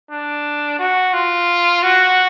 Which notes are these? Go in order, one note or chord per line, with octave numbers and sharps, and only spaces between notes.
D4
F#4
F4
F#4